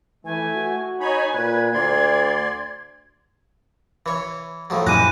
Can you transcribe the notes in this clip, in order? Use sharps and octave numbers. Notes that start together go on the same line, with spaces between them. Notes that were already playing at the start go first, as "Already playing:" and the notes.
E3 A3 G#5
F#4
D#4 C#5 G#5 B5
A#2 B4 G#6
D2 D5 C6
E3 C#5
A2 F3 F#3
F#2 A#2 E3 G4 D#5 A#5 F#6 D#7